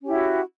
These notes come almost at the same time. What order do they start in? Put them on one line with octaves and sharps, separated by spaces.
C#4 G4 E4 F#4